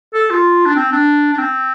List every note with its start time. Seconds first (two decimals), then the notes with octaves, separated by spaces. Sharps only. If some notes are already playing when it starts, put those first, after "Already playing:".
0.14 A4
0.30 F4
0.66 D4
0.76 C4
0.92 D4
1.33 D4
1.38 C4